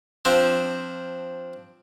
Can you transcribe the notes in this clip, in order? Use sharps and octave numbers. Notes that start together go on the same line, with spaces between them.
F3 C4 D4